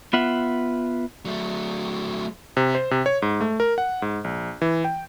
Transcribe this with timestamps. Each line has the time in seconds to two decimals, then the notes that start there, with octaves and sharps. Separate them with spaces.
0.13 B3 F4 E5 F#5
1.25 F#3 A3
2.57 C3
2.75 C5
2.91 C3
3.06 C#5
3.22 G#2
3.41 A3
3.60 A#4
3.78 F#5
4.02 G#2
4.24 A#1
4.62 E3
4.84 G5